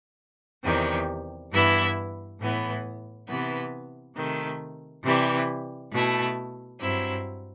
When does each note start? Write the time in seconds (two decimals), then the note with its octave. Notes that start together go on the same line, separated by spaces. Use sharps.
0.63 E2 C3 D#3 G3
1.52 G2 E3 B3 E4
2.40 A2 E3 B3
3.27 C3 E3 B3
4.16 C3 D#3 A3
5.04 C3 E3 G3
5.92 B2 A3 E4
6.80 G2 F#3 C4 E4